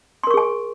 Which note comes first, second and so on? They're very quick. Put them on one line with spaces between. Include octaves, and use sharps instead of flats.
C6 A#4 C#6 G#4 G#5